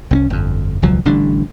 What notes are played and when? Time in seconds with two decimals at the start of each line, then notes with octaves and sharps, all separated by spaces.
0.11 C2 C4 C#4
0.30 G1 F2
0.82 E1 C#2 F3 F#3
1.05 A1 D3 G3 D4